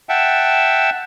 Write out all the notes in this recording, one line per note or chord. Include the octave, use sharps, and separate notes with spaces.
E5 F#5 G5 A5